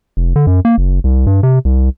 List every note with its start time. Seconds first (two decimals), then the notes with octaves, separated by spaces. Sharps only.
0.17 F1
0.36 D3
0.47 F#2
0.65 A#3
0.78 F#1
1.04 C2
1.27 G2
1.43 C3
1.65 C2